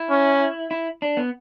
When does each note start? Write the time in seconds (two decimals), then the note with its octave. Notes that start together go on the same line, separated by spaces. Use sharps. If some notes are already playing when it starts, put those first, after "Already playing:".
Already playing: E4
0.10 C#4
0.71 E4
1.02 D4
1.17 B3